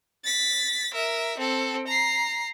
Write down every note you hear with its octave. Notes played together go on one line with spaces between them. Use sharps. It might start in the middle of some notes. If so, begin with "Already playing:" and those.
A6 B6
A#4 E5
C4 A4
A#5 C7